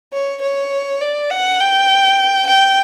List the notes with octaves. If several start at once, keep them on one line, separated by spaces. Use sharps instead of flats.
C#5
C#5
D5
F#5
G5
G5